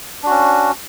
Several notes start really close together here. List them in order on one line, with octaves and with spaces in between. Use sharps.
D4 F#4 C#4